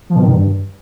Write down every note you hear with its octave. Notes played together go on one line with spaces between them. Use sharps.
F3
B2
D#3
G2